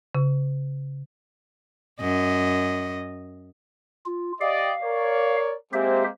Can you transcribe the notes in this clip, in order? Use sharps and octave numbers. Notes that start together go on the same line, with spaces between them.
C#3
F#2 D#5
F4
G4 D5 D#5 F5
A#4 C#5 D5
G#3 A#3 C4 G4 C5 E5